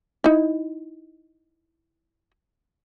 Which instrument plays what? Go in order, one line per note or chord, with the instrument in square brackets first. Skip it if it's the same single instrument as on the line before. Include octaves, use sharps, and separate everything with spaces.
[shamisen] D#4 E4